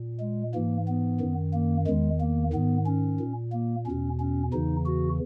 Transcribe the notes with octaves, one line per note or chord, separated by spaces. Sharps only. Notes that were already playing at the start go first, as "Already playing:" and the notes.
Already playing: A#2
G#3
G#2 E3 A#3
B3
F#2 D#3
A#3
E2 D#3 G#3
A#3
G#2 D#3 B3
C#4
A#2
A#3
E2 B2 C#4
C#4
E2 C#3 E3 D#4
F#4